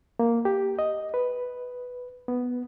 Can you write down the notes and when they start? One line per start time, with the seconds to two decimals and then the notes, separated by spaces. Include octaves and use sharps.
0.19 A#3
0.45 G4
0.79 D#5
1.14 B4
2.28 B3